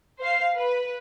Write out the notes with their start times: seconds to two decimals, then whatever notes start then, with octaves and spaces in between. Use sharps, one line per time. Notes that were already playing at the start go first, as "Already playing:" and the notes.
0.20 C5 F5 C7
0.55 B4